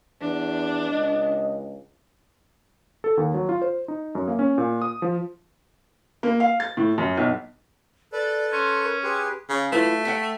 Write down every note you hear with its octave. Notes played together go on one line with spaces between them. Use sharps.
E2 D4
C#2 D#5
A4
D#2
F#3
F4
C5
D#4
F#2
A#3
C#4
A#2
D#6
F3
A#3
F5
A6
A2
F#2
B1
A4 B4 D5
C#4 C6
A#4
G4 G#4 B4 C6
C#3
A3 E4 F4 B4
E5 F#5 G5